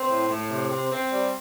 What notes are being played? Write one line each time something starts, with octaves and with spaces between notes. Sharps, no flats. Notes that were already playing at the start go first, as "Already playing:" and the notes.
Already playing: C4
A2
A2
C3
C4
C4
G3